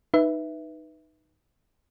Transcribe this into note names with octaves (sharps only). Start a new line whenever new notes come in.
D#4 B4 E5